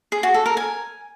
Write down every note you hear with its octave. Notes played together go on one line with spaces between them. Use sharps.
G#4
F#4
A4
A#4
G#5